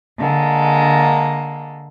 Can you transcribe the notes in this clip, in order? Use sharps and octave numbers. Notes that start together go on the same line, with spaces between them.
D3 G#3 A#3